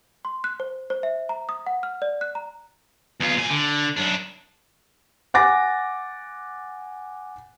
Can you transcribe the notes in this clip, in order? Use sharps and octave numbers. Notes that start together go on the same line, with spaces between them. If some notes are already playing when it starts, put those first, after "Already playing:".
C6
F#6
C5
C5
E5
A#5
D#6
F#5
F6
D5
F#6
A#5
E2 F4
A#2 G#5
D3
F#2 D4
F#5 G#5 D6 A6 A#6